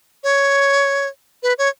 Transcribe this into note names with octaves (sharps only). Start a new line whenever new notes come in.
C#5
B4
C#5